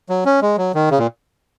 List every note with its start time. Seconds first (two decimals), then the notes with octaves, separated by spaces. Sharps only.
0.09 F#3
0.25 C#4
0.42 G#3
0.57 F#3
0.75 D#3
0.91 C#3
0.99 A#2